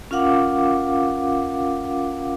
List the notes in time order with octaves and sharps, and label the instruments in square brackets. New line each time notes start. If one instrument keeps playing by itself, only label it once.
[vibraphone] C#4 F4 A#4 F5 F#5 D6